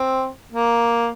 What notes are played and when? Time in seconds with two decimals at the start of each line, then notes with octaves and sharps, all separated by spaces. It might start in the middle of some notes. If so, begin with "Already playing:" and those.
Already playing: C4
0.53 A#3